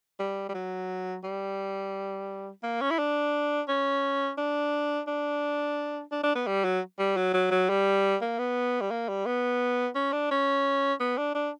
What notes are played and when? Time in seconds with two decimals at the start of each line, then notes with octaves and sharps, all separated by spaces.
0.19 G3
0.49 G3
0.54 F#3
1.24 G3
2.63 A#3
2.81 C#4
2.90 E4
2.98 D4
3.68 C#4
4.38 D4
5.07 D4
6.12 D4
6.23 D4
6.35 B3
6.47 G3
6.64 F#3
6.99 G3
7.17 F#3
7.34 F#3
7.51 F#3
7.69 G3
8.21 A#3
8.38 B3
8.81 G3
8.91 A#3
9.08 G3
9.26 B3
9.95 C#4
10.12 D4
10.31 C#4
11.00 B3
11.17 D4
11.34 D4